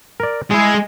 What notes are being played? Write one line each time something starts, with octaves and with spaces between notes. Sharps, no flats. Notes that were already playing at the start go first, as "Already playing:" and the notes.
A#4 D5
G#3 E4 G#4